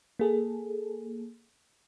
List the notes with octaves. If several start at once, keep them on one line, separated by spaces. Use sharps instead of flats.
A#3 G#4 A4